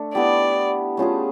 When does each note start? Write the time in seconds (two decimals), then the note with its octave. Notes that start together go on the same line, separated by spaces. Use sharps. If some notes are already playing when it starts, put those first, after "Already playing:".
Already playing: A3 D4
0.14 B3 E4 G4 D5
0.97 A3 C#4 F4 G#4